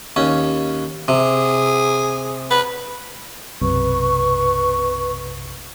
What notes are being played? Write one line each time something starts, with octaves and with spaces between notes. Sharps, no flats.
D#2 C#4
C3 G#4
B4
B1 F#2 C3 B4 C#6